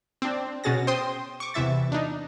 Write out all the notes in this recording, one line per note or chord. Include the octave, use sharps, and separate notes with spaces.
C4 D4
B2 C#4 F#4 G#4 A6 A#6
C5 G5 C6 D#6
C#6 D6
E2 C3 E3 E5 A6
D4 D#4